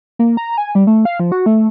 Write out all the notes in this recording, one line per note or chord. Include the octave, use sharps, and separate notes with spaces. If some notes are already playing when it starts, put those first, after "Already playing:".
A#3
A#5
G#5
G3
A3
F5
F3
F#4
A3